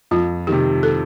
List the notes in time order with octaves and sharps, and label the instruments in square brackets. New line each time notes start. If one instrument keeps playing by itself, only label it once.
[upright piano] F2 [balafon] F4
[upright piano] C3 D#3 [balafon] G4
[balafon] A4